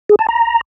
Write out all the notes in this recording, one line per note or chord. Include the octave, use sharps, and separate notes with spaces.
G#4
A5
A#5